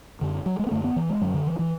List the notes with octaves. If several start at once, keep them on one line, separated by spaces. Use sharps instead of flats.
F#2 D3
F#3
G#3
B3
F#2 D3 A3
B3
E3
G#3
F#2 D3 F#3
D3
E3
E3